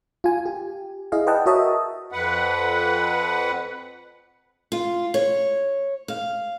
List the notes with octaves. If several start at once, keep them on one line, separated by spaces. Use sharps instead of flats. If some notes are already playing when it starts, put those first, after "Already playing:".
F4 G#5
G4
E4 G#4 D#5 F5
B4 D5 D#5 F#5 G5 A5
F#4 A#4 C#5 D#5 E5 A5
F2 B4 F#5
F4
C#5
F5